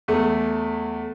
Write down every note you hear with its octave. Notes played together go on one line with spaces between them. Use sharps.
E2 A3